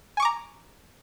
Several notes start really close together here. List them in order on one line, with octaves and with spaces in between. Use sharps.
G#5 C#6 D6 A#5